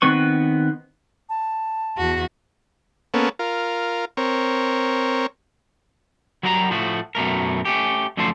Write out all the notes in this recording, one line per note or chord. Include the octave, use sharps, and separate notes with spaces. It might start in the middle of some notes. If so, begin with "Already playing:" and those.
D#3 B3 C4 B4 C#6
A5
E2 F#4
A#3 B3 C#4 A4
F4 A#4
C4 A#4 C#5
F#3 G3 F#4 A#4 F#5 A#5
A2 F3 A3 F#4
F#2 B2 A3 A#4
A3 C#4 G4
F#2 D3 F3 A3 A4 C5